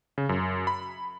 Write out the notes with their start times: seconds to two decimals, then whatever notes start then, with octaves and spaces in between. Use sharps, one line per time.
0.18 C#3
0.29 F#2
0.67 B5